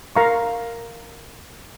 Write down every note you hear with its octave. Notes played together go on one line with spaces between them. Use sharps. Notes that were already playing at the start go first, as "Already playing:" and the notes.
A#4 F5 A#5 C#6